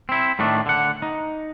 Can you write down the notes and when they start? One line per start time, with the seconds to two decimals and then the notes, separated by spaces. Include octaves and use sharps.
0.09 C4 E4
0.39 A2 D#3 A3 D4
0.66 D3 F#5
1.02 D#4